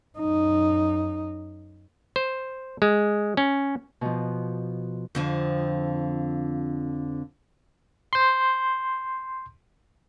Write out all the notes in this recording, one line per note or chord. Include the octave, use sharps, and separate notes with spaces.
F#2 D#4
C5
G#3
C#4
B2 F3
F2 D3 F3
C6 G6